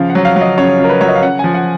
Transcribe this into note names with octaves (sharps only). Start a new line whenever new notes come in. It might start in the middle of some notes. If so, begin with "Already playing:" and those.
Already playing: C#3 F3 F5
F#5
F#3
F5
F#3
D#5
C#3 C#5
C#3
A#4
B4
F#3 C#5
D#5
F5
C#3 F#5
F3 G#5
F#5